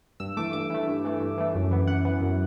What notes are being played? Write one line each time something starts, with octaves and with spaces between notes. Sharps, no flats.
G2 E6
E3 A3 D6
G2 D6
E3 A3
G2
E3 A3
G2
E3 A3
F#2
E3 B3
F#2 F#5
E3 B3
F#2